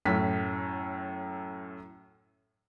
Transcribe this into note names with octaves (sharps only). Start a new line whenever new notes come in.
F#2 A2 B6